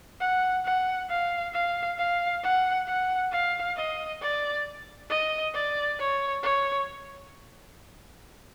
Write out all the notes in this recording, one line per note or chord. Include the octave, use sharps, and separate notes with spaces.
F#5
F#5
F5
F5
F5
F#5
F#5
F5
D#5
D5
D#5
D5
C#5
C#5